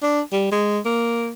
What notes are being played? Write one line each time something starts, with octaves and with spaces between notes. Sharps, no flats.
D4
G3
G#3
A#3